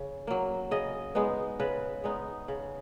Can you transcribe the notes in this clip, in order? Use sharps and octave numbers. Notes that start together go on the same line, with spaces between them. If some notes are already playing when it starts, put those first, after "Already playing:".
Already playing: C#3
F#3 A#3
C#3 D#5
G#3 B3 D#4
C#3 B4
G#3 B3 D#4
C#3